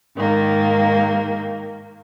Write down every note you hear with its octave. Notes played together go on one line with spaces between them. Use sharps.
G#2 D#3 A#3